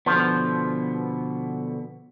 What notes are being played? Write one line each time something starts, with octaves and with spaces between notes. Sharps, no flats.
B2 D3 F3 B3